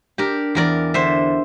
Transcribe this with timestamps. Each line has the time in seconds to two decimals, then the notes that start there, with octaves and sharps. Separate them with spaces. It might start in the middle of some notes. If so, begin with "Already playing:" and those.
0.18 D4 G4 A#4
0.55 E2 A#4 D5
0.94 D3 C5 E5